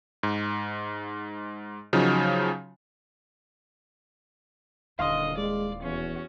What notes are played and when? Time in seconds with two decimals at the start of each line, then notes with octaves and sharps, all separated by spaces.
0.23 G#2
1.93 C#3 F3 F#3 D#4
4.99 D#1 D3 E4 D#5 F5 C6 D#6
5.38 G#3 D5
5.82 E2 C#4 F#4